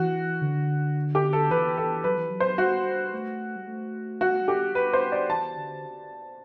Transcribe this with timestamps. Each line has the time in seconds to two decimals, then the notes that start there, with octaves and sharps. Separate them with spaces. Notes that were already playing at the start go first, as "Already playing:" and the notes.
Already playing: E3 F#4
0.42 D3
1.15 G4
1.33 A4
1.51 E3 B4
1.77 A4
2.04 F#3 B4
2.17 E3
2.30 F#3
2.40 C5
2.58 G3 F#4
3.13 A3
3.56 G3
3.68 A3
4.21 G3 F#4
4.31 A3
4.41 G3
4.48 G4
4.75 B4
4.93 C5
5.12 D5
5.29 E3 A5
5.57 D3